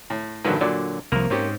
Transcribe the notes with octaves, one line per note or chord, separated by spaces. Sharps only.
A2
A#1 G2 D3 D#3 F#3 B4
A#2 D3 F#3 D5
C2 F3 A#3 A#4
G#2 C4 C#4 G4